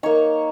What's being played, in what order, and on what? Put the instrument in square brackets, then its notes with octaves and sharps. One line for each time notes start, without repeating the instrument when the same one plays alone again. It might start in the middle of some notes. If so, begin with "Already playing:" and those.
[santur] A#3 D#4 C#5 C#6